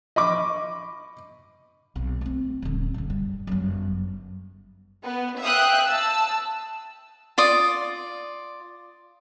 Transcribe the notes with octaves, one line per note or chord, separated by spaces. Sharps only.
D#5 B5 C#6 D6
B1 C3
A3 C4
D#1 D3
F#1 B1
G2
G1 F#2
B3
E5 F5 G5 D#6 F#6
A5 E6
F4 D5 D#6